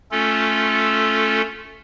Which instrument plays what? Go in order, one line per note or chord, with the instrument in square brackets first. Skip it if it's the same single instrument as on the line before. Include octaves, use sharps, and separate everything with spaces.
[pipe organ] A3 C#4 F4 A4